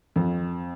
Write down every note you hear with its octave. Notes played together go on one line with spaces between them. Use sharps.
F2